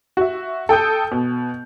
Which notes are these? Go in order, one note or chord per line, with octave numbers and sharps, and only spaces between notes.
F#4 E5
A4 G5 D#6 G6
B2